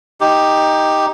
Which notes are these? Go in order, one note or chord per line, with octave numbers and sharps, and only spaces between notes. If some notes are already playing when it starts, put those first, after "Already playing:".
D#4 G4